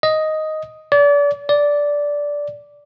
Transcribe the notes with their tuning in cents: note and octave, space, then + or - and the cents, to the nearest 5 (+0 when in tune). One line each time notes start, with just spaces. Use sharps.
D#5 +5
D5 -35
D5 -10